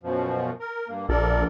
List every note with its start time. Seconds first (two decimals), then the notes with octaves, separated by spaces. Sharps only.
0.03 F#2 B2 F3
0.60 A#4
0.88 G2 A#3
1.09 A#1 A4 A#4 D5